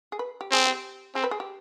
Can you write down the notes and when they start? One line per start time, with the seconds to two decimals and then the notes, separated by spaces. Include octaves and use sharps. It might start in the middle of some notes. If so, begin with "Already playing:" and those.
0.12 G#4
0.19 B4
0.41 G4
0.51 C4 G#4
0.66 G4
1.15 C4 G#4
1.24 B4
1.31 G#4
1.40 G4